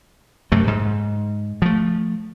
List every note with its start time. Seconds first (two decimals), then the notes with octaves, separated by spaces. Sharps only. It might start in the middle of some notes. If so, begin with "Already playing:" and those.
0.52 F#2 C3 A3
0.67 G#2
1.62 F3 A3